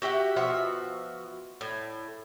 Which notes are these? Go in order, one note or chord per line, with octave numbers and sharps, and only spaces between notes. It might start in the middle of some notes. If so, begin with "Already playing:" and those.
F#4 G4 E5 F#5
B2 F3 F#4 E5
A2